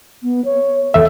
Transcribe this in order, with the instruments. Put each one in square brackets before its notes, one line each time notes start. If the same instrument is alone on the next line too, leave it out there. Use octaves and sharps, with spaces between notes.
[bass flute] B3
C#5
[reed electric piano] E2 E5 [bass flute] A4